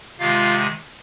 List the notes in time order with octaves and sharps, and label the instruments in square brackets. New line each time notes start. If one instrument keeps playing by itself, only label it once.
[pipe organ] C3 D#3 G#3 F4 F5